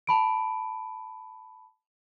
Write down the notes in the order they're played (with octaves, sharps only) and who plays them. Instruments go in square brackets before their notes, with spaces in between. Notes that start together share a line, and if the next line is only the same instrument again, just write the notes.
[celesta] A5 B5 D7